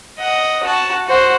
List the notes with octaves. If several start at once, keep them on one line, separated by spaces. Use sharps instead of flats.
D#5 F#5
F#4 A5
F#4 C5